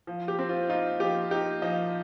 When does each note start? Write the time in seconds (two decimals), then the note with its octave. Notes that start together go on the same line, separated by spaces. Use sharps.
0.07 F3
0.28 G4
0.39 C4
0.49 F4
0.69 D#4 F4
1.00 F3 G4
1.31 D#4 G4
1.62 F3 D#5